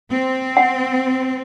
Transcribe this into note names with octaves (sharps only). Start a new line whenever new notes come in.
C4
F#5